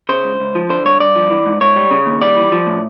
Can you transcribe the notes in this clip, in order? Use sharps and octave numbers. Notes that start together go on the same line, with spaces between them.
C#3 C5
C#2
C#2
F3
D3 C5
G2 C#5
G2 D5
F3
E3
G#2
G#2 C#5
G3
C#3
D#2
G3 D5
E3
F3
A2